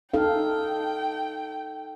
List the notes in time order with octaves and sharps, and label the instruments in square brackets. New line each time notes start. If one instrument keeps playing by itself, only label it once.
[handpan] D#4 A4 F5 [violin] G5